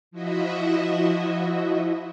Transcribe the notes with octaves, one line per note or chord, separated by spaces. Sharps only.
F3 E4 F#4 D#5 E5